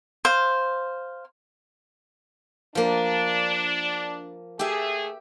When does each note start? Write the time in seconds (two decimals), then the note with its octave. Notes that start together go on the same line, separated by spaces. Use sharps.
0.25 C5 F5
2.75 F3 A#3 D4
4.59 A3 G4 G#4 E5